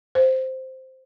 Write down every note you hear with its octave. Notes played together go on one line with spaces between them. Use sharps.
C5